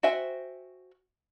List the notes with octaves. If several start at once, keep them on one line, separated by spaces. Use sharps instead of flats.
F#4 C5 E5 G5 G#5